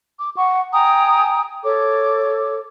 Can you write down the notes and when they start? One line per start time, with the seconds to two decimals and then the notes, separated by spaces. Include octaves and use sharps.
0.19 D6
0.36 F#5 C#6
0.73 G5 G#5 A#5 D#6
1.63 A4 C#5 D6